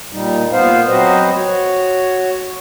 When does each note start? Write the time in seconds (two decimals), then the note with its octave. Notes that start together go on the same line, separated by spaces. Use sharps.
0.12 A#2 G3 D#4
0.52 A#2 B3 C5 F5
0.88 F#3 C4 F#4 B4 C5 D#5
1.34 F#4 C#5